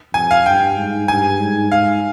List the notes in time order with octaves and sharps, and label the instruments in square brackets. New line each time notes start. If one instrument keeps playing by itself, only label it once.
[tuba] F2 [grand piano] G#5
[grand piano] F5
[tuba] G2 [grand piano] G5
[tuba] G#2
[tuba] G2 [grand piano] G#5
[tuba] G#2
[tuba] G#2 [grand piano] F5